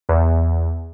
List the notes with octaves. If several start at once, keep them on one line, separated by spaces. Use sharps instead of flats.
E2